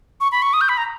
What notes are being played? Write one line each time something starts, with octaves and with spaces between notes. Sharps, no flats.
C#6
B5
C#6
D#6
G6
B5
A#5